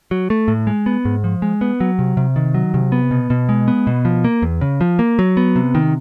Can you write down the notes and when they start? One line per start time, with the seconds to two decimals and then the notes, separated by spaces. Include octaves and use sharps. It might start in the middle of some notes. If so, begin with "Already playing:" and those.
0.11 F#3
0.30 A3
0.48 A2
0.67 G#3
0.86 B3
1.05 G#2
1.24 F3
1.42 G#3
1.61 B3
1.80 F#3
1.99 C3
2.17 C3
2.36 D#3
2.54 F#3
2.74 C3
2.92 B3
3.11 B2
3.30 B2
3.49 G#3
3.68 B3
3.87 B2
4.05 F3
4.24 A#3
4.42 E2
4.61 C#3
4.81 F3
4.99 A#3
5.19 F#3
5.37 B3
5.56 C3
5.75 D#3